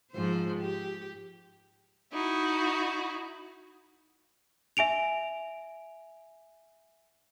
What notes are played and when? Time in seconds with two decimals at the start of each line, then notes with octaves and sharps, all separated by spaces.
0.13 G#2 F3 C5
0.60 G4
2.13 D#4 E4 F#4
4.77 E5 G#5 D7 F7